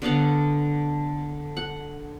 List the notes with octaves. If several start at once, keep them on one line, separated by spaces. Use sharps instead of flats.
D3 B3 F5 F#5
F#5